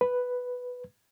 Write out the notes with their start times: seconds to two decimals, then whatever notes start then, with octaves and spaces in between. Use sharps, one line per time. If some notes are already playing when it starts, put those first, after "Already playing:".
0.01 B4